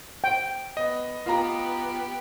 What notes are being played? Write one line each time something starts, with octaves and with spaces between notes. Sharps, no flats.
G5
B3 D#5
B3 F4 G4 A#5